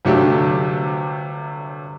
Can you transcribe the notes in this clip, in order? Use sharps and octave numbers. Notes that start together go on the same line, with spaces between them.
G1 C3 F#3 A3 D4 G4